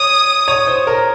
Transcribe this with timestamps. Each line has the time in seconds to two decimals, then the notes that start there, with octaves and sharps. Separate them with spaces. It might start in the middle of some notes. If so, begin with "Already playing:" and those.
Already playing: C#5 D#6
0.48 C#5
0.67 C5
0.87 A#4